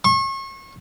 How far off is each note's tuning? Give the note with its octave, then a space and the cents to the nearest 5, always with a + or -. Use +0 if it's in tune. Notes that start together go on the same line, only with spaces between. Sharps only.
C#6 -35